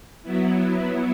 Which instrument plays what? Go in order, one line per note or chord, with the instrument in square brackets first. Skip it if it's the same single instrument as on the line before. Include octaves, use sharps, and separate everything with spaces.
[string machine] F#3 B3 E4